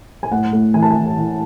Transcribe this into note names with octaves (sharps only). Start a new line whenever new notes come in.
G#5
A2 F#5
A2
E3 G#5
A5
E3 G#5
E3